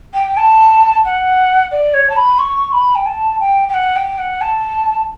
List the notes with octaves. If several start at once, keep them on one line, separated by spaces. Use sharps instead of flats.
G5
A5
F#5
D5
C#5
A5
B5
C#6
B5
G5
A5
G5
G5
F#5
G5
F#5
A5